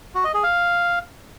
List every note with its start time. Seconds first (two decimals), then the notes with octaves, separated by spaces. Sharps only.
0.15 F#4
0.24 D#5
0.34 G#4
0.43 F5